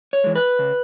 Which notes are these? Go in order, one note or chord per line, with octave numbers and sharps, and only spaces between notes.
C#5
E3 G#3
B4
C#3